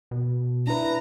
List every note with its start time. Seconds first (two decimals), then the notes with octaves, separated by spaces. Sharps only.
0.11 B2
0.67 D4 E4 B4 A#5